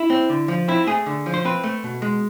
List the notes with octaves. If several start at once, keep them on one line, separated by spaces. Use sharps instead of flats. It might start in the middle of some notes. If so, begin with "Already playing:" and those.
Already playing: E4
C4
D3
F3
C4 E4
A3 G#4
D3
F3
C5
C4 B4
A3
B2
G#3